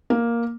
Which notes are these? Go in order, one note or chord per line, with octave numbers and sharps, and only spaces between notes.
A#3